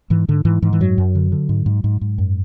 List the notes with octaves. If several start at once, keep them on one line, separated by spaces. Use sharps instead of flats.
G#2 E3
G#2 D3
G#2 E3
G#2 E3
E3
F#2 F#3
F#2
D3
D3
G#2
G#2
G#2
G#2
F#2